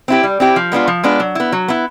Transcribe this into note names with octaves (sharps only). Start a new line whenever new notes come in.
C4 E4 G4
G3
C4 E4 G4
F3
G#3 B3 D4 F4
F3
G#3 B3 D4 F4
F#3
B3 E4
F#3
B3 E4